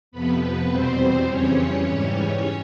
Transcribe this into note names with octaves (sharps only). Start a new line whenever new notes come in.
F2 C3 F3 B3 B4
B3 B4
E2 B2 G3 C4 C5
F2 C#3 E3 G3 C#4 C#5
G#2 E3 G3